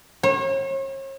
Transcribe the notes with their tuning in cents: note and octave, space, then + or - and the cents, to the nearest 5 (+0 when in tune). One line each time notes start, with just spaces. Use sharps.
C#5 -40